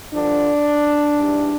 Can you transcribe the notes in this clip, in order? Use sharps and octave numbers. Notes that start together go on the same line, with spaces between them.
G2 D3 F3 D4
G#2 E3 G3